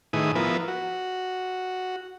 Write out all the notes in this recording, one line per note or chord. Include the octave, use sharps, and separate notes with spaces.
A2 D#3 E4 G#4 B4 D#6
F3 B3 E4 A#4 B4
F#4